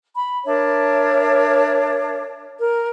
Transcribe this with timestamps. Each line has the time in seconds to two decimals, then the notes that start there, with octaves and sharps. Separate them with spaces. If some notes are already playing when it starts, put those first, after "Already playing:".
0.16 B5
0.45 D4 A#4 C#5 E5
2.57 A#4